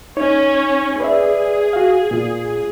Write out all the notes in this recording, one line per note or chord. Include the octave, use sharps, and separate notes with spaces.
C#4 D#4 C#5
G#4 B4 D5 E5
F#4 F5
A#2 F4